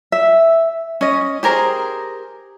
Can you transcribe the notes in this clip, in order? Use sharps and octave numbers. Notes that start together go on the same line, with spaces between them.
E5
C#4 D#5
G4 G#4 A#4 C5